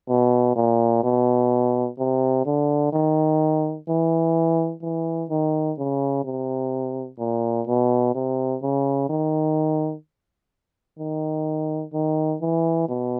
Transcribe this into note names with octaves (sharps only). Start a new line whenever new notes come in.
B2
A#2
B2
C3
D3
D#3
E3
E3
D#3
C#3
C3
A#2
B2
C3
C#3
D#3
D#3
D#3
E3
B2